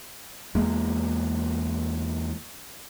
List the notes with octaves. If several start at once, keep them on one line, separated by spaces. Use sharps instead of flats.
E2 G#3 A#3